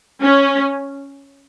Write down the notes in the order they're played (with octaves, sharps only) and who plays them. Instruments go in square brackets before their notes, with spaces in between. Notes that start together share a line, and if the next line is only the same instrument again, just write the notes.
[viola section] C#4